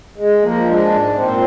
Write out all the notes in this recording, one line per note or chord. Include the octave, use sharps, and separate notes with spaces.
G#3
F3 A#3
G#3 D4
G#2
A#2 C4